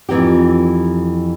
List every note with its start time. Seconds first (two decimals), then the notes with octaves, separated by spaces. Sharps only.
0.09 F2 E3 D#4 G4